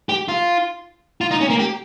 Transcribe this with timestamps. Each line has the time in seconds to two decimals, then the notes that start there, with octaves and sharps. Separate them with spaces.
0.09 G4
0.28 F4
1.21 F4
1.31 D#4
1.41 C#4
1.50 A#3
1.59 G4